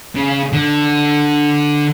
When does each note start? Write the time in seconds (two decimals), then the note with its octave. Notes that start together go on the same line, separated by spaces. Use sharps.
0.15 C#3
0.53 D3